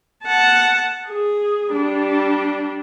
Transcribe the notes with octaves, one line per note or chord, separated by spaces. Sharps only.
F#5 A5
G#4
G3 D4